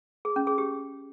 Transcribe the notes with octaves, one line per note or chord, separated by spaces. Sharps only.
G#4
C#4
G#4
G4